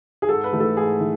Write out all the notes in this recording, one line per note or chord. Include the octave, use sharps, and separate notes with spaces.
G#4
G#2 A4
B4
E3 A3
A4
G#2 G#4
E3